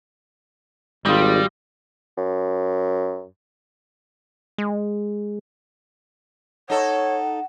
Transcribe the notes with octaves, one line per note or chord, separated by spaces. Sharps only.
G#1 G3 F4 D#5
F#2
G#3
D#4 A4 C#5 F#5